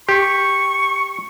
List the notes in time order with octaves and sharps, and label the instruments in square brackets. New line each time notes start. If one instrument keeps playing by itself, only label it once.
[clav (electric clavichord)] G4 [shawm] C#6